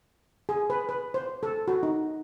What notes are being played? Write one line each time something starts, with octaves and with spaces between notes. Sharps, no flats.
G#4
B4
B4
C5
A4
F#4
D#4